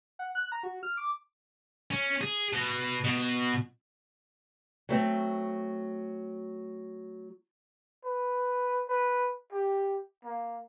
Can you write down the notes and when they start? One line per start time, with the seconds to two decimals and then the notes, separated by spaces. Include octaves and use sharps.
0.19 F#5
0.35 F#6
0.52 A#5
0.63 F#4
0.83 F6
0.97 D6
1.91 C#4
2.21 G#4
2.53 B2
3.04 B2
4.89 F#3 A3 C4
8.04 B4
8.89 B4
9.52 G4
10.25 A#3